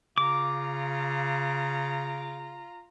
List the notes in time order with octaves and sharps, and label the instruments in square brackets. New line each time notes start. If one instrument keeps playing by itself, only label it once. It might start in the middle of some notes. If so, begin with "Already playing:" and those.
[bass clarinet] C#3 [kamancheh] F4 A#5 [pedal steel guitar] D6